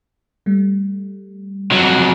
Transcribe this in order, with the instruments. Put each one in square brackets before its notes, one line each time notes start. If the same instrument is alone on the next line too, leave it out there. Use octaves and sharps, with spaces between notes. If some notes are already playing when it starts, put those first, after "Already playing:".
[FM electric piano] G3 A3
[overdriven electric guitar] F2 F#3